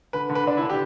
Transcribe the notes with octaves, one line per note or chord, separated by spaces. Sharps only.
D3 B4
D3
B4
D3 D4
E4
D3
G4